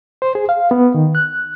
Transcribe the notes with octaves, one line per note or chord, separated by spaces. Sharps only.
C5
G#4
F5
B3
D#3
F#6